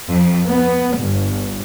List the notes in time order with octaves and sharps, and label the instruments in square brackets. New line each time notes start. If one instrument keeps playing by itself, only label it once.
[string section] F2
B3
G1